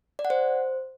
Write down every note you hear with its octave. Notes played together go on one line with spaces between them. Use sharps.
D5
F#5
C5